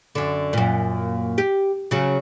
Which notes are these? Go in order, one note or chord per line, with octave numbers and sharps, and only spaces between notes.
F#2 D3
F#2 A#2
G4
C#3 F#3